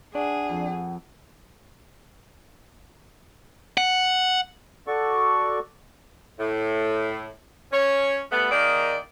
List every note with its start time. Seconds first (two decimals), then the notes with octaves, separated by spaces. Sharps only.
0.15 D4 G#4 D5 F#5
0.49 F2
3.78 F#5
4.87 F#4 A4 D5 C#6
6.39 A2
7.72 C#4 C#5
8.32 G3 A3 B3
8.51 D#3 A#3 D#4 G#4 D5